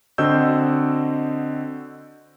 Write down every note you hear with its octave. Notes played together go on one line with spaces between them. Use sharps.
D3 C4 F#4 D#5 E6 G6